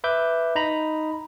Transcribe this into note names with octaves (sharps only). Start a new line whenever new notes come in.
B4 E5 D6 G6
D#4 A#5 B5